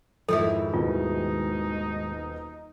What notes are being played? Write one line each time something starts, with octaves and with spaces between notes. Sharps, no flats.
F2 G#2 D#3 E4 A4
D#1 B2 D#4 F4